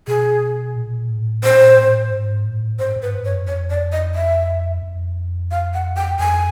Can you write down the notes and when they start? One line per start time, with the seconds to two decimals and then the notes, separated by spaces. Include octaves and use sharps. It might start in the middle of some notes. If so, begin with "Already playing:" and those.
0.08 B2 G#4
0.76 A#2
1.09 A2
1.43 A#2 C5
1.77 A2
2.12 G#2
2.45 A2
2.79 G#2 C5
2.96 G#2
3.02 B4
3.14 G2
3.25 C#5
3.30 F#2
3.47 F2 C#5
3.70 D5
3.92 D#5
4.15 E5
4.83 F2
5.51 F5
5.74 F#5
5.96 G5
6.19 F2 G#5